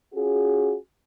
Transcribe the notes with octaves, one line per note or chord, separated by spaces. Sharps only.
C#4 F4 F#4 G#4